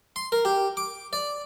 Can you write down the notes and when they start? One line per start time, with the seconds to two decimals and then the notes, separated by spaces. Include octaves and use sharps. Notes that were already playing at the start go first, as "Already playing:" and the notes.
0.16 C6
0.32 A#4
0.45 G4
0.77 D6
1.13 D5